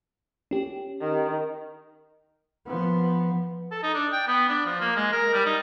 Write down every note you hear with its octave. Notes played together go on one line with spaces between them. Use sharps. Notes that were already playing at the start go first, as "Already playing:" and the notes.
C#4 G4
D#3
F3 B3
A4
D#4
D4
G5
B3
D4
F3
A#3
G#3
A#4
G3
D#4